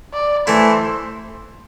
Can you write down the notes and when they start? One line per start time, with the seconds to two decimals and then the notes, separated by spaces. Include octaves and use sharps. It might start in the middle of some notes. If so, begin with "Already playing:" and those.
0.13 D5
0.47 E3 A3 E4 C5